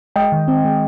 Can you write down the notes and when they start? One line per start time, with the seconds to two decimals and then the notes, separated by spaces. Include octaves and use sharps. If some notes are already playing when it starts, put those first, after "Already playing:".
0.16 G#3 D#5 G5
0.32 D#3
0.48 C4
0.65 G#3